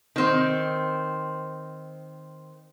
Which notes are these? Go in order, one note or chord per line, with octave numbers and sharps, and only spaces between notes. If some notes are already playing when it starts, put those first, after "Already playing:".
D#3 C4